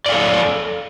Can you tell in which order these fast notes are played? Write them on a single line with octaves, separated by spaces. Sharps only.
D5 F5 A4